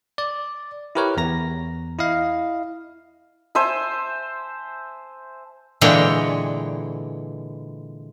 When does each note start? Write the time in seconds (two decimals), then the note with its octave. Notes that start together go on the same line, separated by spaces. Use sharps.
0.18 D5
0.95 E4 G4 A#4 B4 C#5
1.17 E2 A#5 A#6
1.98 E4 D#5 F5
3.55 C5 E5 G#5 A5
5.81 A#2 D3 E3 G#3 C#5 G5